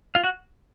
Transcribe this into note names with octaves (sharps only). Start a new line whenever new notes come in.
F4 F5
F#4 F#5